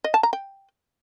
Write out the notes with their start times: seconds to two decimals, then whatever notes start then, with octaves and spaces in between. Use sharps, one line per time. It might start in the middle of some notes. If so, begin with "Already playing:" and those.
0.04 D#5
0.14 A5
0.23 A#5
0.33 G5